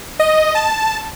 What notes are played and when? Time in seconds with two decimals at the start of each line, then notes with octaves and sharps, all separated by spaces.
0.20 D#5
0.55 A5